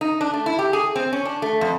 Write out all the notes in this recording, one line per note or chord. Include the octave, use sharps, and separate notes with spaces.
D#4
D4
A3
E4
G4
G#4
C4
C#4
D4
A3
F2